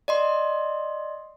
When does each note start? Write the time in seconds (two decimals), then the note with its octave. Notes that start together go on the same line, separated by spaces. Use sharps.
0.08 D5 D#5 C6